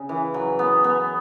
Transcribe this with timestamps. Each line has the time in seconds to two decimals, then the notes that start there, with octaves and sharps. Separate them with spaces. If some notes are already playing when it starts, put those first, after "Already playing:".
Already playing: C#3
0.09 E3
0.34 F#3
0.59 B3
0.84 B3